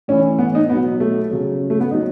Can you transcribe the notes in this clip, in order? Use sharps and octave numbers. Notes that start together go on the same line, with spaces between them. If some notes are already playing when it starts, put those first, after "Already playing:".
A2 E3 C#4
B3
D#4
B2 F#3 B3
A3
C#3 F#3
A3
B3
A2 F#3 D#4